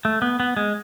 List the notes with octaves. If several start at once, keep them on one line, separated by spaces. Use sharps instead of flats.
A3
B3
B3
G#3